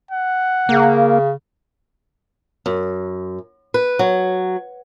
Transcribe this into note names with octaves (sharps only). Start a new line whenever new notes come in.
F#5
C#3 A#3
F#2
B4
F#3